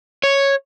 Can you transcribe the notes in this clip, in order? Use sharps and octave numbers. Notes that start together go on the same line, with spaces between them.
C#5